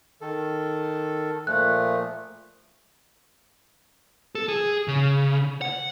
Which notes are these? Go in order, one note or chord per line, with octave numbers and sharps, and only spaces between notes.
D#3 A4
A#2 F3 A3 F#6
A4
G#4
C#3
F#5